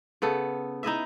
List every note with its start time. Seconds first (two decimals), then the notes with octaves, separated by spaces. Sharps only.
0.22 C#3 B3 A4
0.83 D#4 E4 D#5 E5